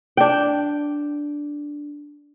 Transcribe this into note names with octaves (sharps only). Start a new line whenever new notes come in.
D4 G5